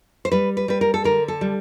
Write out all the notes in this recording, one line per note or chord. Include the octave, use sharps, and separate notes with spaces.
C5
G3 B4
B4
G3 B4
A#4
A4
D3 A#4
A4
G3